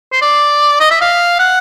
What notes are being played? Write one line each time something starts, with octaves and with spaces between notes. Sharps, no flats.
C5
D5
D#5
E5
F5
F#5